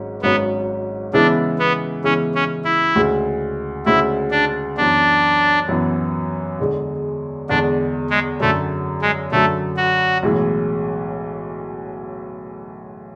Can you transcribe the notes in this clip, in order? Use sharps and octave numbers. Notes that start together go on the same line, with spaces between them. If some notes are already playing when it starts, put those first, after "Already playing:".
Already playing: G#1 G#2 F#3 C#4
G#1 G#2 F#3 B3 C#4
C#3 E3 G#3 B3 D4 E4
B3
C#3 E3 G#3 B3 C#4 E4
C#4
E4
D2 C#3 G#3
D2 C#3 G#3 E4
D4
F#2 E3 B3 D4
F#2 E3 B3
E2 D3 G#3
E2 D3 G#3 D4
G#3
F#2 D3 F#3 A3
G#3
F#2 D3 F#3 A3
F#4
B1 A2 E3 G#3